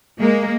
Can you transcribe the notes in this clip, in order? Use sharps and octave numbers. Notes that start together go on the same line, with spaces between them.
G#3 A#3